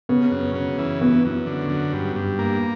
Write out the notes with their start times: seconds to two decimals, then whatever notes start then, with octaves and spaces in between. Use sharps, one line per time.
0.09 C#3 B3
0.32 F#2
0.55 C#3
0.78 E3
1.01 F#2 B3
1.25 F#2
1.47 D3
1.70 F#2
1.93 G2
2.16 G2
2.39 A#3